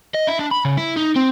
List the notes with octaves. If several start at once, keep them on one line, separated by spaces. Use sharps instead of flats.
D#5
E4
D4
B5
C#3
E4
D#4
C4